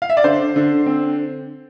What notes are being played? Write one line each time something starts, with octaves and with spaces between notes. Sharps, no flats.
F5
E5
D5
D3 C5
D3
C4